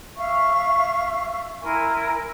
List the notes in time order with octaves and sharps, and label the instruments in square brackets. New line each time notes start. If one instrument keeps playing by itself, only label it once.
[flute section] E5 F5 C#6
E4 A#4 G#5 C6